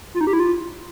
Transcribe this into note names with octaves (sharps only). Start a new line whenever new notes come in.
F4
D#4
G4
E4
F4